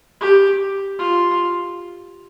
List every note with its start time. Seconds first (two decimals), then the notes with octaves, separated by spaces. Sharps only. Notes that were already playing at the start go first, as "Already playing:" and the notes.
0.21 G4
0.99 F4